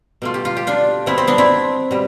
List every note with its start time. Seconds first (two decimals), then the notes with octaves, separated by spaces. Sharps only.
0.22 B2 A3 F4
0.34 G4
0.45 F4
0.57 G4
0.67 D4 F4
1.06 B2 B3 C4 E4
1.18 C4
1.27 B3 D4
1.38 C4 E4
1.91 B2 G3